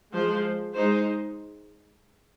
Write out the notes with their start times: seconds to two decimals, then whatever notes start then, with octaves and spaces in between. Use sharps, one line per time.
0.12 F3 G#3 F4 C5
0.75 G#3 D#4 C5